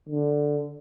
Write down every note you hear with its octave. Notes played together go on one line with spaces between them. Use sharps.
D3